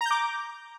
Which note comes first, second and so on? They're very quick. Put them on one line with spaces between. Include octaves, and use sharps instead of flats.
A#5 G6 D6